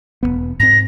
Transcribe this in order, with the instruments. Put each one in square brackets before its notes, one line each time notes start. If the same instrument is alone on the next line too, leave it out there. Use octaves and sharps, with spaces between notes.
[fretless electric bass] E1 D#2 B3
[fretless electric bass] G#2 C4 [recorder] A#6